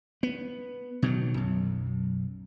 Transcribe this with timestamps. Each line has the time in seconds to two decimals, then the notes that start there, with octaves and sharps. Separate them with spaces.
0.23 B3
1.02 B2 D#3 F#3
1.34 B1 F#2